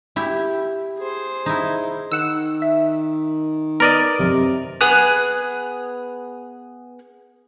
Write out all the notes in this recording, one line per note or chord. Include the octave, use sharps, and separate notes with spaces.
E4 G4
G#4 C5
D#4 E4
D#3 F#5 E6
E5
B3 A#4 B4 D5 D#5
G#1 F#2 C3
B3 G#4 F#6